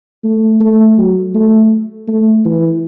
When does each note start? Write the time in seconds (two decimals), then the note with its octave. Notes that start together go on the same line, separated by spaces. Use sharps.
0.24 A3
0.60 A3
0.98 F#3
1.34 A3
2.08 A3
2.45 E3